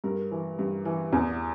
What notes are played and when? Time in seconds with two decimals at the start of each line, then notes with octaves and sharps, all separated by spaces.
0.04 G2 A#4
0.31 E3
0.59 G2
0.85 E3
1.13 E2